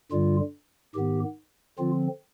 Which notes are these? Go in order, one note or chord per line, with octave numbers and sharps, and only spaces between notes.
G2 D3 G3 F4
G#2 D#3 B3 G4
D3 F3 C4 F4